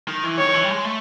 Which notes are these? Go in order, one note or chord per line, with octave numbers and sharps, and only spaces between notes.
D#3
E3
D#3 C#5
E3
G3
G#3
A3